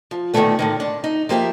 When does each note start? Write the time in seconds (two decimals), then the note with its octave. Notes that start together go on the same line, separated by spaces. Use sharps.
0.11 F3
0.34 A#2 D#3 E3 G#3 A3 B3
0.59 A2 D3 D#3
0.80 D4
1.04 D#4
1.29 F3 A#3 G4 E5